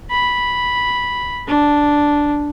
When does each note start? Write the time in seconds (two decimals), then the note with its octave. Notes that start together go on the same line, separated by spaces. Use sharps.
0.11 B5
1.48 D4